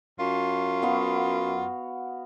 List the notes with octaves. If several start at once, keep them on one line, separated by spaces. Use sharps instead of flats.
F#2 F4
B3 F#4 F5